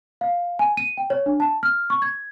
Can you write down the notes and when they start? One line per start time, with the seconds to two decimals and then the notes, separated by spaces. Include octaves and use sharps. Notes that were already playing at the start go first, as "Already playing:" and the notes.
0.21 F5
0.59 G#5
0.77 D#7
0.97 G5
1.10 C#5
1.26 D4
1.40 A5
1.63 F6
1.90 C#6
2.02 G#6